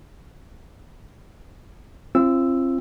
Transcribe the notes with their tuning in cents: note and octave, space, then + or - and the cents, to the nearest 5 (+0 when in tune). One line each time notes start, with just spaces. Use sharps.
C4 +30 F4 -35 E6 +0